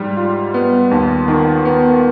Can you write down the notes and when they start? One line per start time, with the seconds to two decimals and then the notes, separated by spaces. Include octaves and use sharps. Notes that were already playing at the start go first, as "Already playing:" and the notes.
Already playing: G#2 G3
0.17 F4
0.54 B3
0.91 D#2
1.28 D#3
1.65 B3